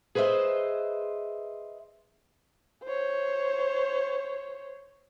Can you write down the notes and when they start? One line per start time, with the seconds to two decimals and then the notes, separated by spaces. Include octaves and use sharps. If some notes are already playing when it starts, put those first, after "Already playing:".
0.15 G#4 B4 C5 D#5 E5
2.84 C5 C#5